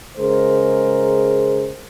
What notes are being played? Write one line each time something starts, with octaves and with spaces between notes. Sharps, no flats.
C#3 G#3 A#4 C5